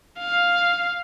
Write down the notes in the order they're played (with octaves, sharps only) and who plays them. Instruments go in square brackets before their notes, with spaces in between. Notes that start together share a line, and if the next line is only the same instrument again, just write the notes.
[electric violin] F5